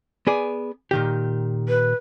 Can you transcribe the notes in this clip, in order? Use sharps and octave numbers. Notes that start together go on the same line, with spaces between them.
B3 G#4 D5
A#2 D#3 G4
B4